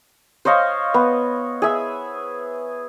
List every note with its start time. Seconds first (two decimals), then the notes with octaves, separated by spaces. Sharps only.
0.45 C5 C#5 D#5 F5
0.94 B3
1.62 G#4 E5